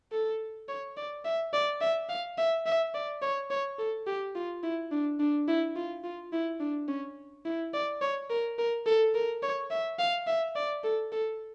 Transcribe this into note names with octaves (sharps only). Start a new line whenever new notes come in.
A4
C#5
D5
E5
D5
E5
F5
E5
E5
D5
C#5
C#5
A4
G4
F4
E4
D4
D4
E4
F4
F4
E4
D4
C#4
E4
D5
C#5
A#4
A#4
A4
A#4
C#5
E5
F5
E5
D5
A4
A4